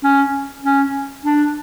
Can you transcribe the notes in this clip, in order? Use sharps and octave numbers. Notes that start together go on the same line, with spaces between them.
C#4
C#4
D4